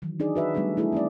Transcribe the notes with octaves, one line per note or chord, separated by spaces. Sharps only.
D#3 E3 F#3
D4 D#4 G#4 D5
F#4 B4 E5
F#3 G3 A3 B3 D4 G#4
A3 E4 G#4 A4
C4 C#4 D5